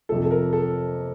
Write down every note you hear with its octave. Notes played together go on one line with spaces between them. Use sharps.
F2 C3 F3 A4
A4
A#4
A4